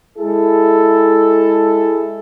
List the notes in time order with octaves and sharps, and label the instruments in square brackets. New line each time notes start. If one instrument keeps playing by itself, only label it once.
[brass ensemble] G#3 E4 G#4 A4